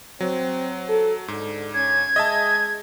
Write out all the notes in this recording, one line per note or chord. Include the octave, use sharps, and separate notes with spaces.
F#3 C4
A4
G#2 D3
C#4 G#6
G#3 D#5 E5 A5